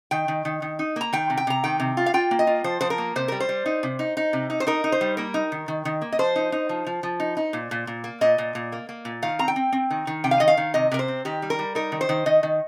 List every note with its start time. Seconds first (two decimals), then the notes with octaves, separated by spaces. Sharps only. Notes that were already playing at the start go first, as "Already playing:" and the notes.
0.11 D#3 G5
0.28 D#3
0.45 D#3
0.62 D#3
0.79 D#4
0.96 A#3 A#5
1.13 D#3 G5
1.30 C3
1.37 G5
1.47 C3 A#5
1.64 D#3 G5
1.80 C3
1.97 F4
2.06 F5
2.14 F4 G5
2.31 A#3
2.39 D#5
2.47 F4
2.64 F3 C5
2.81 F3 C5
2.90 A#4
2.98 A#3
3.16 C3 C5
3.28 G3 A#4
3.40 C5
3.49 G3
3.66 D#4
3.83 C3
3.99 D#4
4.17 D#4
4.33 C3
4.50 D#4
4.60 C5
4.67 D#4 A#4
4.84 D#4
4.92 C5
5.01 G3
5.17 A#3 A#4
5.34 D#4
5.52 D#3
5.68 D#3
5.85 D#3
6.02 A#3
6.12 D#5
6.19 F3 C5
6.36 D#4
6.52 D#4
6.69 F3
6.87 F3
7.03 F3
7.20 D#4
7.37 D#4
7.53 A#2
7.71 A#2
7.87 A#2
8.04 A#3
8.21 A#2 D#5
8.38 A#2
8.55 A#2
8.72 A#3
8.89 A#3
9.05 A#2
9.22 D#3 F5
9.39 C4 A#5
9.48 G5
9.56 C4
9.72 C4
9.91 D#3
10.07 D#3
10.24 C3 G5
10.31 F5
10.40 D#3 D#5
10.48 F5
10.57 D#3
10.74 C3 D#5
10.91 C3 A#4
10.99 C5
11.08 C4
11.25 D#3 G4
11.42 G3
11.50 A#4
11.59 G3
11.75 D#4 A#4
11.92 D#3
12.01 C5
12.09 D#3
12.26 D#3 D#5
12.43 D#3